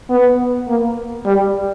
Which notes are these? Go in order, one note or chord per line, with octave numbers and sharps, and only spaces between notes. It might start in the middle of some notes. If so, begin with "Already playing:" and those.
B3
A#3
G3